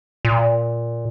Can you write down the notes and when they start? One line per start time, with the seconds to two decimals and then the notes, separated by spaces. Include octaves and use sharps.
0.25 A#2